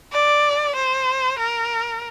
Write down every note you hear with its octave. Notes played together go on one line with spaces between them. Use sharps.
D5
C5
A#4